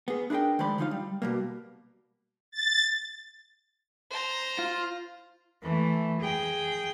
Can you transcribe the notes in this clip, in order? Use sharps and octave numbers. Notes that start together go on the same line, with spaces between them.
B3 G#4
D4 E4 G#4 A#4 G5
D#3 F3 G#3 C5 D5 B5
D3 F3 D#4 F4 F5
G3
B2 G3 A#3
A6
C5 A#5
F4
E3 A3
G#4 G5